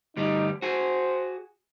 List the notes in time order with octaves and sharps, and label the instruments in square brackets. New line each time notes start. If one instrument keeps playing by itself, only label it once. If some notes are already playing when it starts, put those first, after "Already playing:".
[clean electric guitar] D2 G2 G3 [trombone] D#4
[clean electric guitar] F#4 G#4 [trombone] C5